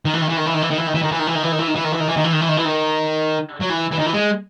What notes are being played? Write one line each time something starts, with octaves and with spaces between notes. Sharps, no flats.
D#3
E3
D#3
E3
D#3
E3
D#3
E3
D#3
E3
D#3
E3
D#3
E3
D#3
E3
D#3
E3
D#3
E3
D#3
E3
D#3
E3
D#3
E3
D#3
E3
D#3
E3
D#3
E3
D#3
F#3
E3
E3
D#3
E3
G#3